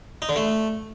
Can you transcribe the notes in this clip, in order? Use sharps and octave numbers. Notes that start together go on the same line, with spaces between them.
D#4
D3
A3